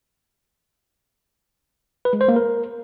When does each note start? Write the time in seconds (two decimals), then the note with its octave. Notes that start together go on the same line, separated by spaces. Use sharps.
2.05 B4
2.13 G#3
2.21 C5
2.28 A#3
2.36 A#4